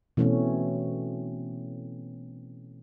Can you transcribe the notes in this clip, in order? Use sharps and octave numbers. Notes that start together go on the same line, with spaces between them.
B2 E3 A3 C4 C#4